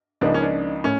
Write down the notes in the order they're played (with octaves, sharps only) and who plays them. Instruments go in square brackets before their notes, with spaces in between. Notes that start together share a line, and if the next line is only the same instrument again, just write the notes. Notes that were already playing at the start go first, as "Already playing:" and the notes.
[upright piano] C#2 C#3 F3 A#3 D#4 [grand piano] D4
[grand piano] C#4
D4
[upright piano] A2 [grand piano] C#4